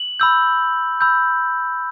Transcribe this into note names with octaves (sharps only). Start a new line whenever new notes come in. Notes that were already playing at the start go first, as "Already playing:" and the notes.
Already playing: F#7
B5 E6 G6
B5 E6 G6